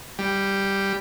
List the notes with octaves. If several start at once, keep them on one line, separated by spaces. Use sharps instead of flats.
G3